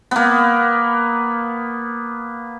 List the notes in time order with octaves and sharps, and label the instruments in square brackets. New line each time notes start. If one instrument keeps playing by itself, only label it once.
[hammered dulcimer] A#3 B3